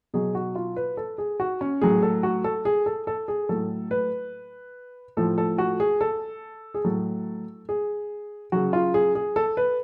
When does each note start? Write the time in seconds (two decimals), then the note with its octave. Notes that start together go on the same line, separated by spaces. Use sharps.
0.14 B2 F#3 G#4
0.35 F#4
0.55 F4
0.76 B4
0.97 A4
1.18 G#4
1.40 F#4
1.61 C#4
1.82 A2 F#3 G#4
2.03 A4
2.23 F#4
2.44 A4
2.65 G#4
2.86 A4
3.07 A4
3.28 G#4
3.49 A2 F#3 A4
3.91 B4
5.17 A2 F3 A4
5.38 A4
5.58 F#4
5.80 G#4
6.01 A4
6.74 G#4
6.85 A2 F#3 A4
7.69 G#4
8.52 C#3 F#3 F#4
8.73 F4
8.94 G#4
9.15 G#4
9.36 A4
9.57 B4